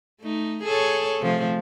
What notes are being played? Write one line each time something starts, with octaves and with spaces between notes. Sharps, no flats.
A3 D#4
G#4 A4 C#5
C3 F3 A3